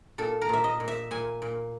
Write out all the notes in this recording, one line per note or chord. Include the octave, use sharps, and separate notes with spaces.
A#2 A4
A#4
A#2 E5
D#5
A#2
E5
A#2 G#5
A#2